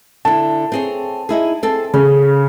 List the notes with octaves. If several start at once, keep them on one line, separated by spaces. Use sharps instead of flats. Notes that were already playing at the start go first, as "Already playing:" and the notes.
D3 E4 A5
C4 G#4 C#5
D#4 E4 G#4
C4 G#4 A4
C#3 C#4